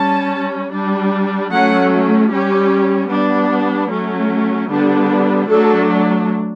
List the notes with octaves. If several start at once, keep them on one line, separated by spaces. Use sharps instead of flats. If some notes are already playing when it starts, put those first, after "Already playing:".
Already playing: G3 C#4 A5
G3 D4
F#3 A3 C#4 F#5
G3 C#4 G4
G3 B3 D4
F#3 A3 C#4
D3 G3 B3 D4
F#3 A3 D4 A4